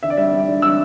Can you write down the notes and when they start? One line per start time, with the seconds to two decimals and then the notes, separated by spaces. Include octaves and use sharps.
0.03 D3 E5
0.10 D5
0.17 G3 E5
0.34 G3
0.48 D3
0.62 G3 E6